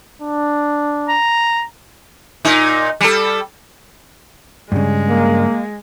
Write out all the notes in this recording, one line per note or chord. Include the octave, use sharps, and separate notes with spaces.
D4
A#5
A#2 D#4
G3 A4
G2 C#3 G#3
A#3